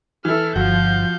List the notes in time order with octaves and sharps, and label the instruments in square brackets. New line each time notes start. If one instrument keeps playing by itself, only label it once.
[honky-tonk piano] E3 E4 [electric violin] A4 F6
[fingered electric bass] G1 [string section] F3 [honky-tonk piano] F#4 [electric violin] F5 G6